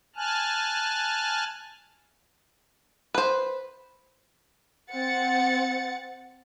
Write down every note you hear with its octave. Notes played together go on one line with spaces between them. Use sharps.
G#5 A5 F6 F#6
B4 C5
C4 F#5 A6 C#7